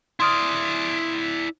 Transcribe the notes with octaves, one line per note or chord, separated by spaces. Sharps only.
E4 D5 C6 D#6 F6